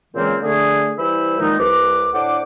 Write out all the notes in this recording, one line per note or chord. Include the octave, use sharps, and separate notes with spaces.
A#2 C#3 E3 G#3 A#3 C4
D3 A3 G#4
E3 G3 E4 C5 B5 E6
A#2 D#3 F3 G#3 B3 D#4
C2 B4 D6
A2 D4 C5 F#5 D6